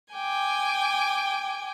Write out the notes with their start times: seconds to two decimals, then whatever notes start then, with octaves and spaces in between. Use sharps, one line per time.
0.13 G5 G#5 D6